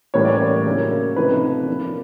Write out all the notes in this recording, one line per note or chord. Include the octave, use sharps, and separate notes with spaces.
A2 E3 G3 A#3 C#4 C#5
D5
C#5
C#3 F#3 A#3 D4
C3 F3 A3 C4 D#4 B4
F3 A#3 D4